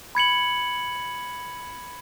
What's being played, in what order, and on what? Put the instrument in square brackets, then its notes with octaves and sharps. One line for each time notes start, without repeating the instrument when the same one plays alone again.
[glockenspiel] B5 G#6 C#7 F#7